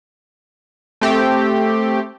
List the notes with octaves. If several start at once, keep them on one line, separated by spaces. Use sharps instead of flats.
A3 C4 G4